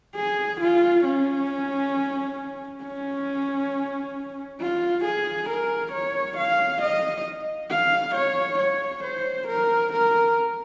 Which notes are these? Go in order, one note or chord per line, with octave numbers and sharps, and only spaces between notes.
G#4
F4
C#4
C#4
F4
G#4
A#4
C#5
F5
D#5
F5
C#5
C#5
C5
A#4
A#4